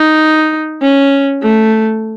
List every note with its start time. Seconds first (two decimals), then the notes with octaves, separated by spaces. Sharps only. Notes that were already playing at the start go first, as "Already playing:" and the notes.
Already playing: D#4
0.82 C#4
1.42 A3